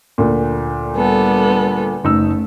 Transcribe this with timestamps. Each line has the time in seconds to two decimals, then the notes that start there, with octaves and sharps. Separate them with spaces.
0.18 D2 A#2
0.96 G3 B3 A4
2.04 F#1 A3 D#4 E6